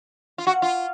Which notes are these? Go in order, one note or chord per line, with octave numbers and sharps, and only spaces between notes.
F4
F#4
F4